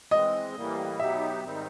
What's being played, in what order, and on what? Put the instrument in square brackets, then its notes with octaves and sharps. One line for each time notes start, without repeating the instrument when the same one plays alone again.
[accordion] E3 G#3 C4 [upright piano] D#5
[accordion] A2 E3 G3 A#3
[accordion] B2 F#3 B3 D#4 G4 [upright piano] E5
[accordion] G#2 D#3 G3 C4 D#4